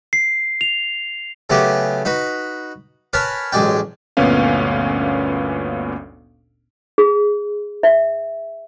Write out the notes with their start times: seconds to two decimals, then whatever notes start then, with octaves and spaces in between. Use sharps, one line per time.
0.13 C7
0.61 F7
1.50 C#3 F#3 A3 B3 F#4 G4
2.05 D#4 F#4 B4
3.13 A#4 B4 C#5 G#5 A5 B5
3.52 A1 F#3 G#3 D5 G5
4.17 G1 D2 A#2 B3 C#4 F5
6.98 G#4
7.83 E5